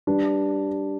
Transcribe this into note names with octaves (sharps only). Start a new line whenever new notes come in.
G3 D4 B4